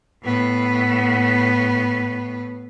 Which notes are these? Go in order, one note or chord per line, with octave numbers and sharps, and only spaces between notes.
A2 B3